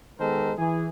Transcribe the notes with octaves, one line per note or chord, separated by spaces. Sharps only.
D#3 G#3 B3 A4 A#4 C5
E3 G#4